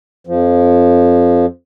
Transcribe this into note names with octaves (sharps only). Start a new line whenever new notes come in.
F2 F3